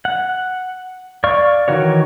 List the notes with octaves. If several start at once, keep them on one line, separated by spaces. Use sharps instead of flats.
F#5
D5 F5 C#6
D#3 E3 F#4 C#5